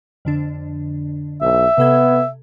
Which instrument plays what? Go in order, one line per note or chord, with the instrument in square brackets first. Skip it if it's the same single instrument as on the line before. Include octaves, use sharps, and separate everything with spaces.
[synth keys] F2 D3 D4
[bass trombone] B1 [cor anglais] E5
[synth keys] C3 A4 G#6 [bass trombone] B3